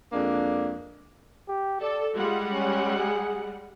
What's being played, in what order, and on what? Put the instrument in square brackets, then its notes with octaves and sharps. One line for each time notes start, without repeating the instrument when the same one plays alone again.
[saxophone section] F2 G#3 A#3 D4
[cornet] G4
[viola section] A4 [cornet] D5
[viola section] G3 G#3 F#5 [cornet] F4
[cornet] C#4
G#4